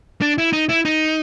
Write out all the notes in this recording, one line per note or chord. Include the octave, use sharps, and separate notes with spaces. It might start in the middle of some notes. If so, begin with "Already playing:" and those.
D4
E4
D#4
E4
D#4